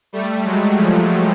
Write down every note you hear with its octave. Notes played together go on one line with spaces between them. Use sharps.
G3 A3
F#3 G#3
F3 G3